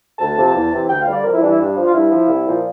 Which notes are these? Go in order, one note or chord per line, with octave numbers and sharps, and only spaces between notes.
D2 A5
C3 F3
E2
C3 E3
D2 G5
F5
D3 G3
D5
F2 A#4
E4
E3 G3 D4
E4
G2 D4
F3
F4
G2 E4
F3
C2
A#2 F3